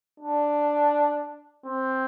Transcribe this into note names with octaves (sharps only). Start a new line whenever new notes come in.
D4
C4